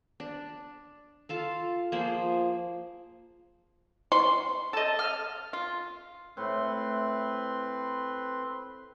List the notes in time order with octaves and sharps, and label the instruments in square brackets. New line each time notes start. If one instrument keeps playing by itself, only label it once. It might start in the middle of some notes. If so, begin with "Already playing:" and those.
[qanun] D4
F4 A4 F5
F3 A#3 G#4 C5
[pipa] C6
[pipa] A4 [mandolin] D#5 A5
[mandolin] F6
[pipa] F4
[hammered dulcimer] A2 [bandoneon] C4 B4 C6